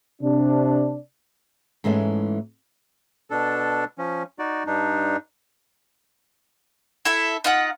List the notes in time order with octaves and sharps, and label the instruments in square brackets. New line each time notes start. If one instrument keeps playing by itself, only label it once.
[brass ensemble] C3 D4
[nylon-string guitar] G#2 E3 G#3 A3 C#4
[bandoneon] B2 D4 A4
F3 C#4
D#4 F#4 D5
G2 D4 D#4
[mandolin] E4 A4 E5
D#4 F4 F#5